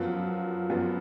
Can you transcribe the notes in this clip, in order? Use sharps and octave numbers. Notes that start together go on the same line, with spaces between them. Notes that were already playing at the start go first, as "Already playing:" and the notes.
Already playing: F#2 F3 B3 F4
F#2 F3 B3 F4